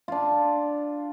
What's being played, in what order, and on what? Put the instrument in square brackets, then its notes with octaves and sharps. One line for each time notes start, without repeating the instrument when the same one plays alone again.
[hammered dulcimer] D4 F4